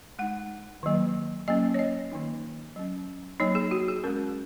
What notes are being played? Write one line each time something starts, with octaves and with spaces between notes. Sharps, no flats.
G#3 D#4 F#5
D#3 F#3 A#3
F#3 A#3 C#4 D#5
C#5
D#5
D#3 A#3 D#4
F#3 C#4
F#3 A#3 D#4 C#5
G#4
F#4
G#4
G#3 C#4 A#4